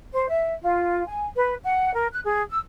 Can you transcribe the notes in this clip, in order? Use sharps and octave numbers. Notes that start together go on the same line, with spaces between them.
C5
E5
F4
G#5
B4
F#5
A#4
F#6
G#4
E6